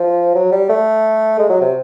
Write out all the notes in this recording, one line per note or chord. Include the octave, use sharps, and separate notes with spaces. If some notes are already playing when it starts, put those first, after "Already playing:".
Already playing: F3
F#3
G3
A3
G#3
F#3
C3